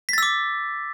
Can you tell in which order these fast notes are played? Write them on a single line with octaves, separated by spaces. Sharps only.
B6 A6 E6 D6